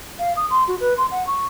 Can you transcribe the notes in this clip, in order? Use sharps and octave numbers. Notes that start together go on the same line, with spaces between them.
F5
D#6
C6
F#4
B4
C6
F#5
C#6